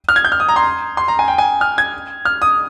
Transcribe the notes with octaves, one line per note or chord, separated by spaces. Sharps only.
F6
G#6
G6
F6
D#6
A#5
C6
C6
A#5
G#5
G5
G#5
F6
G#6
F6
D#6